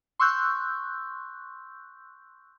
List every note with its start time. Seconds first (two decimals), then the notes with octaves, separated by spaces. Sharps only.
0.20 C6 C#6 E6 F#6 G6